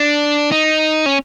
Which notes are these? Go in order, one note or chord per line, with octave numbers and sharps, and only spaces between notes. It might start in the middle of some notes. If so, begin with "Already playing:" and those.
Already playing: D4
D#4
C#4